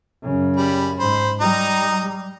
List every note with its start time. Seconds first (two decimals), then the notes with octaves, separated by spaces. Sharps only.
0.23 F#2 C#3
0.56 G3 B5
1.00 G#2 C5 B5
1.41 G3 D#4 A#5